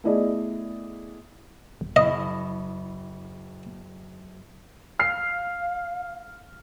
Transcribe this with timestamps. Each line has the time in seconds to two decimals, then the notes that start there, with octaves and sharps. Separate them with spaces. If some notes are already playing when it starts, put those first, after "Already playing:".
0.04 A3 B3 E4 G#4 D5 D#5
1.81 D1
1.96 F#1 E4 D#5 B5
4.99 F5 F6 C7